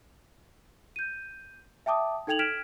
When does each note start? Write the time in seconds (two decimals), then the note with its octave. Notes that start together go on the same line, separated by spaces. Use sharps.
0.96 G6 D#7
1.86 E5 G5 A5 D6 D#6
2.27 D#4 A4 G5 G#6 F7 F#7
2.39 F6 G#6 B6 D7 E7